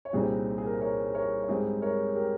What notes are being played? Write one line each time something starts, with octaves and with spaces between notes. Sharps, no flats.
C#5
C2 A#2 G3 C4 D#4 G#4 C5
G#4
A#4
C5
A#4 C#5
A#4 C#5
C#5
G#2 G3 C4 D#4 G#4 C5
A#4 C#5
G4 A#4